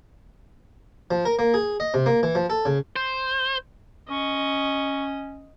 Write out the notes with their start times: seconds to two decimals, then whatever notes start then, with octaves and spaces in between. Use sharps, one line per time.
1.11 F3
1.25 A#4
1.39 A#3
1.54 G#4
1.80 D#5
1.94 C3
2.06 A#3
2.23 E3
2.35 F3
2.50 A4
2.65 C#3
2.96 C5
4.10 C#4 D#5 C#6